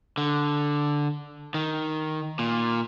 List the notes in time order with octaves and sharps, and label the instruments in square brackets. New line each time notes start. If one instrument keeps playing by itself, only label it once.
[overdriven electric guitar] D3
D#3
A#2